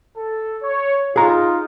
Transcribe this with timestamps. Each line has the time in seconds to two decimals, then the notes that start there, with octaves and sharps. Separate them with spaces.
0.17 A4
0.63 C#5
1.16 D#4 F4 G#4 A#5